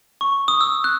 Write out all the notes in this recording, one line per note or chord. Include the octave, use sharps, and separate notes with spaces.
C#6
D#6
E6
F#6